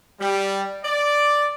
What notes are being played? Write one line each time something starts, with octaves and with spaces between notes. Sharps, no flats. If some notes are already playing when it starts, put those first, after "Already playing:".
G3
D5